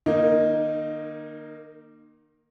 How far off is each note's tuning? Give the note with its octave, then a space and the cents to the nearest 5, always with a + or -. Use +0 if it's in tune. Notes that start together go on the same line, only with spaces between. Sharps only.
D#3 -35 A#3 +10 D#4 +0